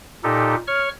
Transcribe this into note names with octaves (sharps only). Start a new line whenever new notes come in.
A#2 D#4 G4 A4
C#5 C#6 F6